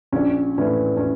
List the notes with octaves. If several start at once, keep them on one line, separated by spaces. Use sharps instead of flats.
A#1 C#4
A2 E3 A3 C#4
C#4